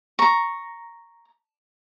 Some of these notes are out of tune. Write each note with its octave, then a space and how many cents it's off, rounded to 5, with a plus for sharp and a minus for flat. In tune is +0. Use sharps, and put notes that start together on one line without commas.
A#5 +0 C#6 +0